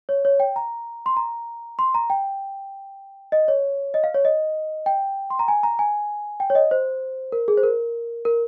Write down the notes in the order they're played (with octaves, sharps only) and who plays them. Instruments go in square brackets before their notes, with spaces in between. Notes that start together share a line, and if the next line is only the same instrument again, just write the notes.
[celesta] C#5
C#5
G5
A#5
C6
A#5
C6
A#5
G5
D#5
C#5
D#5
F5
C#5
D#5
G5
C6
A#5
G#5
A#5
G#5
G5
C#5
D#5
C5
A#4
G#4
C5
A#4
A#4